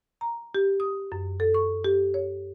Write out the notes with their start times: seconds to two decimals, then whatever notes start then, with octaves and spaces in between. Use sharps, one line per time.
0.21 A#5
0.55 G4
0.80 D#6
1.12 F#2
1.40 A4
1.54 C#6
1.84 G4
2.14 C#5